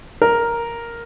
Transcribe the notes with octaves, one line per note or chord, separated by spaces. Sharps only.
A#4